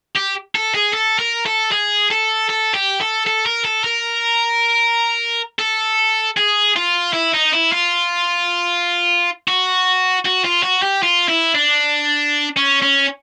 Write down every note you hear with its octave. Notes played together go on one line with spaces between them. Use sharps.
G4
A4
G#4
A4
A#4
A4
G#4
A4
A4
G4
A4
A4
A#4
A4
A#4
A4
G#4
F4
E4
D#4
E4
F4
F#4
F#4
F4
F#4
G4
F4
E4
D4
C#4
C#4